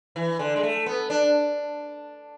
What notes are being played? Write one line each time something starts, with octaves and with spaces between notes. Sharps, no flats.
E3
D3
G#3
A3
B3
D4